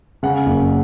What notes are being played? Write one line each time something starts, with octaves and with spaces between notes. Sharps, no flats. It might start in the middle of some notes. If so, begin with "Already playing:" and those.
C#3 F#5
F#1